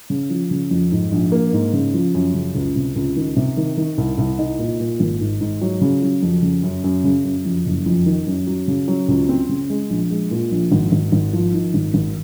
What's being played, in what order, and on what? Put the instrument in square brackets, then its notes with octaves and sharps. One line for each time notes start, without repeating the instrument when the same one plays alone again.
[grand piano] C#3
F3
C#3
F2
G#2
A#1
A#3
G#2
C#3
F3
F#2
C#3
C#2
C3
C#2
D#3
C3
D#3
D#3
C2
C2
D#4
A#2
A#2
G#1
G#2
G#2
F#3
C#3
F#3
F2
C#3
F#2
F#2
C#3
F#2
F2
F#1
F2
D#3
F#2
F#3
C#3
F#3
C#2
C4
C#3
G#3
A#1
G#3
A#2
A#1
G#1
G#1
G#1
F3
D#3
G#1
G#1